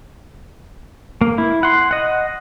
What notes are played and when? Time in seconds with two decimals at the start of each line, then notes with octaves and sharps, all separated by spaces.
1.21 A#3
1.38 E4
1.63 F#5 C6
1.91 D#5 F#5